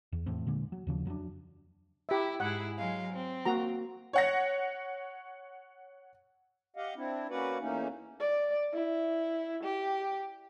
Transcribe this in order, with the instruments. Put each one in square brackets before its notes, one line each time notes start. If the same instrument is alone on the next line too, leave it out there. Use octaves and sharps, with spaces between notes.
[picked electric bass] E2
F1 E2 A2 C4
A#2 D3 G#3
F#3
D#2 C#3 F3
F2 F#3 C#4 D4
[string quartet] E4 [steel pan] G4 E5
[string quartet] G#2 E4 G#4 [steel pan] F#5
[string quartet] F#3 G#3 F5
C4
[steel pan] A#3 F#4 A#5
[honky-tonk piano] C#5 F#5 A#6
[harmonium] G4 D#5 F5 F#5
C4 D4 E4
A#3 C#4 F#4 B4 D5 F#5
E2 E3 A3 A#3 C#4 D#4
[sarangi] D5
E4
G4